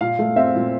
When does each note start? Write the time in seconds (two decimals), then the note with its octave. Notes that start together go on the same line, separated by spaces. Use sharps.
0.01 A#2 F5
0.19 A3
0.36 C4 E5
0.55 A#2